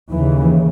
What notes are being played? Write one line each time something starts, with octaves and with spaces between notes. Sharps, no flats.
D#2 C#3 E3